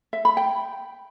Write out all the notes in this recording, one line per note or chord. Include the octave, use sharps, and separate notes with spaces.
E5
B5
G5